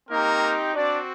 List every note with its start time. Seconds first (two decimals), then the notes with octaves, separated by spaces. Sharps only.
0.09 A#3 C4 D#4 G4 A#4
0.75 C4 D4 F#4 D5